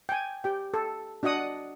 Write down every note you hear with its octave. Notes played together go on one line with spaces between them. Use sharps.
G5 G#5
G4 G5
A4
D4 F#4 D#5 F#5 D#6